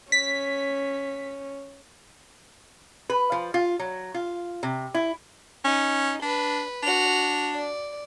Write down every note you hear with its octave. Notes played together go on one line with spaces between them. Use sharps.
C#4 B6
B4
F3
F4
F#3
F4
C3
E4
C#4 D#4
D4 B4
D4 F#4 F7
D5